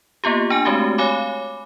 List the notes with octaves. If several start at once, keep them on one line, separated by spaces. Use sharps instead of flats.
A#3 B3 F4 G4
D4 G#5
G#3 A3 C4 F#4 G4
C#5 F5 G#5 B5 D6